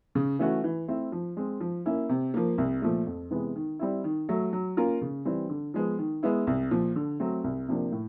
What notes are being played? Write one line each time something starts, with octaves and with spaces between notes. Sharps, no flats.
C#3
E3 A3 C#4 F#4
E3
A3 C4 E4
F3
G#3 C4
F3
A#3 C#4 E4
C3
F3 A#3
C2
A#2 F3 A3
F2
C3 E3 G#3 B3
D#3
G3 C4 E4
D#3
F#3 A3
F#3
A#3 C#4 F4 A#4
C#3
E3 G3 C4
D3
F3 G#3 B3
D#3
G#3 B3 E4
C2
A#2 F3
D3
F#3 A3 C4
C2
C3 F3 A#3 D4
A2